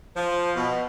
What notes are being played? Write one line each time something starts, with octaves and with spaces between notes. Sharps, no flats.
F3
B2